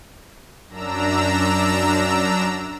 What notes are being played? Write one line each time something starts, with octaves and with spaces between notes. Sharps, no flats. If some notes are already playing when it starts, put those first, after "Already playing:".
F#2 D4 A#5 E6